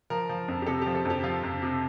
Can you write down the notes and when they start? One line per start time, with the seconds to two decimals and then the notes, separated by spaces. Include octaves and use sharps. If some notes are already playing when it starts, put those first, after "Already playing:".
0.10 F3 A#4
0.29 F3
0.48 F2
0.62 G4
0.66 C3 A4
0.82 G4
0.86 F3
0.95 A4
1.05 F2 G4
1.23 F3 F4
1.43 F2
1.62 C3